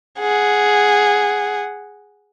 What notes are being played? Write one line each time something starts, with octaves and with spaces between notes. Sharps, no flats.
G#4 F#5